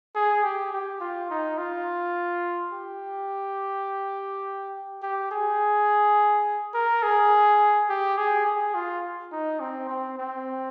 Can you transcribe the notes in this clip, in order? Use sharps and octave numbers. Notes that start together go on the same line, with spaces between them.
G#4
G4
G4
F4
D#4
F4
G4
G4
G#4
A#4
G#4
G4
G#4
G#4
F4
D#4
C4
C4
C4